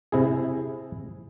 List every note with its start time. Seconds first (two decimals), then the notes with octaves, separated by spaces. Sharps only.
0.12 C3 E4 G#4